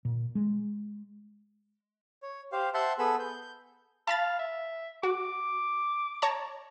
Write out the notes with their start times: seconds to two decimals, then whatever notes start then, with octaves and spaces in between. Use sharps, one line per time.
0.05 A#2
0.35 G#3
2.22 C#5
2.52 G4 C5 F5
2.74 C5 E5 F#5 A5 C6 G6
2.99 B3 G#4 A4 B4 B5 E6
3.19 G6
3.41 G6
4.07 F5 A5 B5 A6
4.39 E5
5.03 F#4 D6
6.22 C#5 A5 A#5